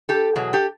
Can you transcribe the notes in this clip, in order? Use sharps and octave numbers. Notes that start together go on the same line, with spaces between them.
G4 A4
E2 B2 F#3 G#4
G4 A4